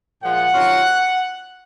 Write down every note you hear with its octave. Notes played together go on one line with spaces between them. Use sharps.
A#2 F3 G#3 F#5
C3 D#3 F#3 C#4 F4